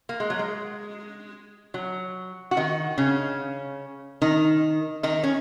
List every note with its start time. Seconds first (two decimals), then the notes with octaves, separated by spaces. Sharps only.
0.09 A#3
0.20 G#3
0.30 F#3
0.39 G#3
1.74 F#3
2.51 F#4
2.57 D#3 D#4
2.98 C#3 C#4
4.22 D#3 D#4
5.03 D#3 D#4
5.24 C#4